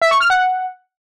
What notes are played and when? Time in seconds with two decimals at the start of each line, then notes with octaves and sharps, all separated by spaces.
0.02 E5
0.11 C#6
0.20 F6
0.30 F#5